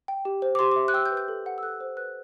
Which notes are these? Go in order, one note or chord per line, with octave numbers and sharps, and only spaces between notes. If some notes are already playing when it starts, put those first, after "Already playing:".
G5
G4
C5
D6
G4 C6
E5 D6
F#6
G5 E6
G6
B4
G6
A4
F#5
E6
A4 F#6
C5
B4 F#6